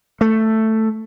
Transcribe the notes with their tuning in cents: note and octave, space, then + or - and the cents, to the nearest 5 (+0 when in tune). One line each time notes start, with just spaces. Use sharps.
A3 +5